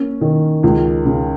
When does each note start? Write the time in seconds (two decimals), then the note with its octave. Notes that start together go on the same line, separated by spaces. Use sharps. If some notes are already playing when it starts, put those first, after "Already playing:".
Already playing: A#3 C#4
0.21 D#3
0.63 C#2
1.05 C#3